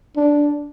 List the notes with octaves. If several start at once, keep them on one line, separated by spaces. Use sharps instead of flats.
D4